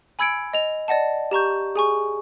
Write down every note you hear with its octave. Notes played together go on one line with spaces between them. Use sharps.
G#5 B5 E6 G#6 C#7 D7
D#5 F7
D5 D#5 F#5 A5
G4 A#5 C#6 G6
G#4 G#5 C#6